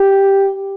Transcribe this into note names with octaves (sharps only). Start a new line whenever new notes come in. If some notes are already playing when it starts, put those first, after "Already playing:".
Already playing: G4